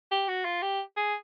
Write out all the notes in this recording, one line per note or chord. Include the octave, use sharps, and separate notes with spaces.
G4
F#4
F4
G4
G#4